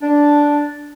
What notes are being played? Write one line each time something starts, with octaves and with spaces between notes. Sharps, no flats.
D4